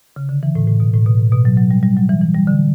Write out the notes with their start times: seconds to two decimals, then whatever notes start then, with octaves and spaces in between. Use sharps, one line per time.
0.16 C#3
0.29 D3
0.43 E3
0.55 A2
0.67 A2
0.80 B2
0.93 A2
1.06 B2
1.20 A2
1.32 B2
1.45 F#3
1.57 F#3
1.71 G3
1.83 G3
1.97 F#3
2.09 E3
2.22 E3
2.34 G3
2.47 D3